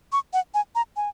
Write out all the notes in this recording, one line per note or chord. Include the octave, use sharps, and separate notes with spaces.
C#6
F#5
G#5
A#5
G#5